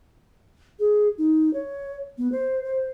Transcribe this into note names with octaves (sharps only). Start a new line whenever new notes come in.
G#4
D#4
C#5
B3
C5
C5